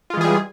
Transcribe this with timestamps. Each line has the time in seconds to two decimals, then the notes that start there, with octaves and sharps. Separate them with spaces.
0.10 F4
0.14 G#3
0.17 E3
0.21 G#4
0.24 G3